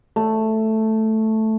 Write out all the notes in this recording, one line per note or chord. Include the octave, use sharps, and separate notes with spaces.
A3